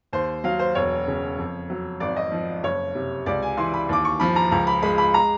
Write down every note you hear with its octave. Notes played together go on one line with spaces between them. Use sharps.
D#2 C5
F#3 F5
C5
E1 C#5
C#3
F2
F#3
G#1 D5
D#5
F3
F#1 C#5
C3
C#2 D5
G#5
E3 C6
B5
D#2 D6
C#6
F3 B5
A#5
C#2 A#5
B5
G#3 B5
B5
A#5